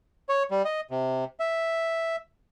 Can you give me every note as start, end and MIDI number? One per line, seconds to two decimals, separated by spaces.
0.29 0.43 73
0.51 0.63 55
0.65 0.81 75
0.91 1.24 48
1.40 2.16 76